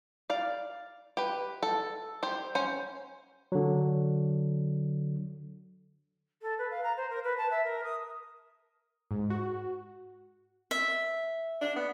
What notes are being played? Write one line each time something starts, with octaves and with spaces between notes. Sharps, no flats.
D5 F5
G4 B4
A4
G4 C5
C#4 C5
D3 F#3
A4
B4
F5
A#5
C5
A#4
B4
A5
E5
A#4
D#6
G#2
F#4
E5
D4
B3